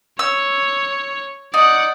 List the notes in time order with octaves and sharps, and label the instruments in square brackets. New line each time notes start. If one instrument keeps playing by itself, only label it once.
[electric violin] C#5 [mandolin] E6
[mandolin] D#4 [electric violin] D5 F#5